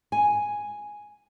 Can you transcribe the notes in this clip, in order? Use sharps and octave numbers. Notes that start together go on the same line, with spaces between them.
G#5